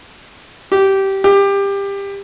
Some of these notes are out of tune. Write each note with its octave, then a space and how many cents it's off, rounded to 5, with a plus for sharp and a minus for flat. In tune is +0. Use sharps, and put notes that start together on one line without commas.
G4 -15
G4 +20